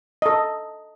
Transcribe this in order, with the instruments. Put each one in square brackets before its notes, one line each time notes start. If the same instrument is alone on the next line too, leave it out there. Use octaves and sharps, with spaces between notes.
[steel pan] A4 D#5